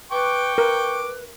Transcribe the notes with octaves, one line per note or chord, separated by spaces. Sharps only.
B4 G5 C#6 D6
A#4 B4